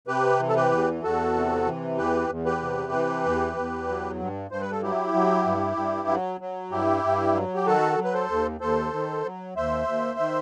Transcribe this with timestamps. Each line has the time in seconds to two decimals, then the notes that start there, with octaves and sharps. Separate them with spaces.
0.08 C3 G4 B4
0.40 E3
0.48 A4
0.56 G4 B4
0.71 E2
1.03 E2 F#4 A4
1.35 C3
1.66 E3
1.97 E2 G4 B4
2.29 E2
2.45 G4 B4
2.62 C3
2.92 E3
3.25 E2
3.56 E2
3.88 F#3
4.20 G2
4.51 G2 C5
4.61 B4
4.71 A4
4.82 F#3 E4 G4
5.14 F#3
5.45 G2
5.76 G2
6.09 F#3
6.41 F#3
6.71 G2 E4 G4
7.04 G2
7.34 F#3
7.55 G4
7.66 D#3 F#4 A4
7.98 F#3
8.04 B4
8.13 A4 C5
8.29 D#2
8.61 D#2 A4 C5
8.93 D#3
9.25 F#3
9.56 D#2 C5 E5
9.87 D#2
10.19 D#3